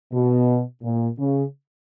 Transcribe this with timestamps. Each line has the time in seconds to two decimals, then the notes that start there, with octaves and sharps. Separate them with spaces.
0.12 B2
0.83 A#2
1.19 C#3